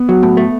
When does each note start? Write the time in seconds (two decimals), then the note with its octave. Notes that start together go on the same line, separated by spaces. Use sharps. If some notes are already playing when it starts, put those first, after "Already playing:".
Already playing: B3
0.09 F#3
0.23 A2
0.37 A3